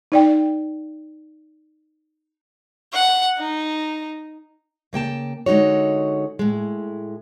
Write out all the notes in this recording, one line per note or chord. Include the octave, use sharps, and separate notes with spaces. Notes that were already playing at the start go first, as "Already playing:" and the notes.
D#4 D5 G5
F#5
D#4
C#3 A#3 G5 A5
D3 G#3 D#4 F#4 C#5
A2 G#3